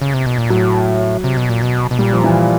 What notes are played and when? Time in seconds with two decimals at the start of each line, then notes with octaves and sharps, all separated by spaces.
0.02 C#3
0.14 C3
0.26 B2
0.38 A#2
0.50 A2 F#3
1.24 C3
1.37 B2
1.49 A#2
1.62 B2
1.91 B2
1.99 A#2 G3
2.13 F3
2.24 E3